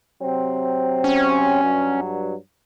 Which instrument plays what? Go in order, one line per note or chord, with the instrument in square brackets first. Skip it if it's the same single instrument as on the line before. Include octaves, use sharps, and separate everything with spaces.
[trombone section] C3 F#3 C4
[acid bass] C#4
[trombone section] G2 F#3